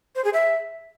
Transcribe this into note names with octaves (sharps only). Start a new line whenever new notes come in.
C5
G#4
E5